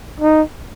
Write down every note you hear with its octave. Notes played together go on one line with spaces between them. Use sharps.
D#4